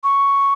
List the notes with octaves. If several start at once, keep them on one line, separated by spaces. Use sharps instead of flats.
C#6